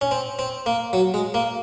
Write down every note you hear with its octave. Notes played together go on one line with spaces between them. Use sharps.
C#4
C4
C4
A#3
F#3
G#3
A#3